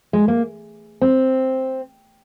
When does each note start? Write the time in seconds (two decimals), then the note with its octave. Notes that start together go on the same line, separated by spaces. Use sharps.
0.13 G#3
0.28 A#3
1.01 C4